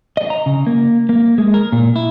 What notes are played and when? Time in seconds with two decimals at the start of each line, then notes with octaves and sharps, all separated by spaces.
0.17 D#5
0.30 A#5
0.46 C#3
0.67 A#3
1.09 A#3
1.38 G#3
1.54 A#4
1.72 A#2
1.96 E4